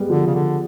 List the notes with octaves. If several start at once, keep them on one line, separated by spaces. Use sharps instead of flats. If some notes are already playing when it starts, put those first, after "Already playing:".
Already playing: G3 G#3 B3
D3 F3
C#3
D3